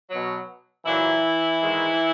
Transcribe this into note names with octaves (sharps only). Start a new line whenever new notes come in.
F#3
B2
A#2 E3 F#3 E4
G#2 D#3 G#3